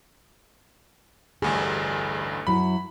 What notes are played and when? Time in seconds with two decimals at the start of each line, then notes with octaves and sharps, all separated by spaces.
1.42 A1 D2 G2 G#4
2.47 F#2 F#3 E4 B5